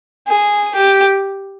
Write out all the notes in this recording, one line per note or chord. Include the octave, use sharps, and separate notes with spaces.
G#4
G4